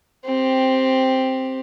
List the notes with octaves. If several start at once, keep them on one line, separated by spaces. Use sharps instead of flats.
C4 G4